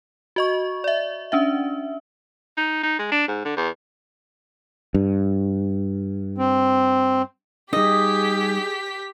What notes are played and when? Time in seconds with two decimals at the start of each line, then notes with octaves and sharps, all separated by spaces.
0.36 F#4 D#5 C#6
0.84 D5 E5
1.32 C#4 D4 E5
2.57 D#4
2.83 D#4
2.99 G#3
3.11 D4
3.28 G#2
3.45 D3
3.57 E2
4.94 G2
6.38 C4
7.73 G3 D#4 G4 G#4 D#5 B6